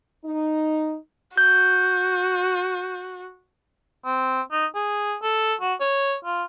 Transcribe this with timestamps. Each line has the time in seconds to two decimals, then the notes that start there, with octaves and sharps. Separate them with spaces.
0.25 D#4
1.38 F#4 G6
4.05 C4
4.52 D#4
4.75 G#4
5.22 A4
5.61 F#4
5.80 C#5
6.25 F4